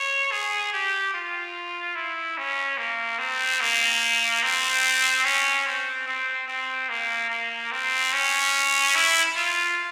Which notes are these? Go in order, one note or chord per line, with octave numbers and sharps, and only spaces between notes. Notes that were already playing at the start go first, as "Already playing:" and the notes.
Already playing: C#5
G#4
G4
F4
E4
C#4
A#3
C4
A#3
C4
C#4
C4
C4
C4
A#3
A#3
C4
C#4
E4
F4